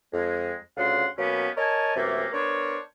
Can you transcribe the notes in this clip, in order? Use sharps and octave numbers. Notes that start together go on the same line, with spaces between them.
F2 G#3
D2 C#3 F4 F#5 C6
B2 F#3 A#3 B3 C#4 G4
A#4 C#5 D#5 G#5 A5
F#2 C3 E3 A3 A#3
B3 D4 A#4 C5 C#5